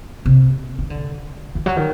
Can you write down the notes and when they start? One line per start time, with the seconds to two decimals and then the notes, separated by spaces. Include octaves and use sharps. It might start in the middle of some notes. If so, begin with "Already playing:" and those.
0.26 C3
0.79 D#3
0.90 D3
1.55 D#3
1.66 F#3
1.76 D#3